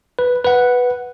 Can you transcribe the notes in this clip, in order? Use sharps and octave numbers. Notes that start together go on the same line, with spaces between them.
B4
B4 F#5